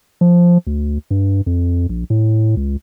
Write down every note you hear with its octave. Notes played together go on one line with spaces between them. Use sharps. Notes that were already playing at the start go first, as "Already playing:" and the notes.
F3
D2
G2
F2
A#1
A2
C#2